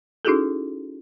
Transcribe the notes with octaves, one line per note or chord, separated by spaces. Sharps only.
C#4 D#4 E4 F#4 G#4 A4